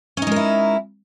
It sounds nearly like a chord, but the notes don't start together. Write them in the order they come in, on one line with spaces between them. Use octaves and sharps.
C#4 D#4 G#3 A#4 E4